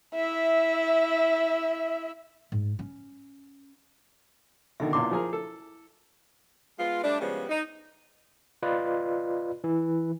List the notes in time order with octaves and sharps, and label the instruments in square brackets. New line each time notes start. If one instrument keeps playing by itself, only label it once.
[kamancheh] E4 E5
[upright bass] G#2
C#4
[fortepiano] B2 D3 D#3 [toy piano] E5
[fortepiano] B1 A#2 C6 [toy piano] E4 D6
[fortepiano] F3 G#4 A#4
A4
[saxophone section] G#3 B3 F4
G3 A3 D4
C#3 F3 G3 G#3 B3
D#4
[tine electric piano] F4 B4 D5 D#5
E3